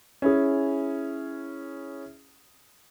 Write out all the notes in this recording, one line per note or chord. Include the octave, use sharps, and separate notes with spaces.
C#4 E4 G#4